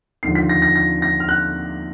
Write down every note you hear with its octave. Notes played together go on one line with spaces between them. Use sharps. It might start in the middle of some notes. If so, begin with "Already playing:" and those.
D#2 D3 F3 C7
B6
A#6
A#6
A#6
A#6
F6
F#6